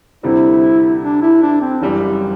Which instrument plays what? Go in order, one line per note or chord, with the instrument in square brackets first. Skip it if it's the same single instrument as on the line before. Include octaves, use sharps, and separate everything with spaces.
[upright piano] D2 C3 G3 C4 [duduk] E4
[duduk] D4
E4
D4
C4
[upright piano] F#1 F#2 E3 G3